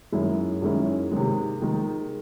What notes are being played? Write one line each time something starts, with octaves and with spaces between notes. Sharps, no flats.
F#2 D#3 G#3 C#4 E4
F#2 D#3 G#3 C#4 E4
C3 D#3 G#3
C3 D#3 G#3